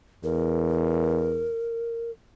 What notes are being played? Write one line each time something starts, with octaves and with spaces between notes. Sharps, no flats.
E2 A#4